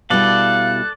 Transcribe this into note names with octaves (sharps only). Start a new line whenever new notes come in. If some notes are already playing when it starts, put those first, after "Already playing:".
B2 G3 E4 A4 D5 F5 F#6